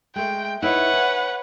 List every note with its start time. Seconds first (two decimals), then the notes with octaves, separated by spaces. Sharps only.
0.16 G#3 A3 G5
0.62 D#4 E4 B4 C#5 F#5
0.93 G#5